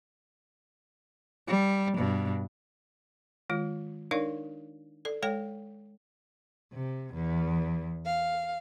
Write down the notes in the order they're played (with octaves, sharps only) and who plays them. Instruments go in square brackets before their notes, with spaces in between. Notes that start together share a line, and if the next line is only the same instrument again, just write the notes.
[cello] G3
G2 B2
[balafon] D#3 G#3 F4
D4 D#4 A#4 C#5 D5 F5
A4 D5
G#3 A4 C#5 G5
[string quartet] C3
E2
F5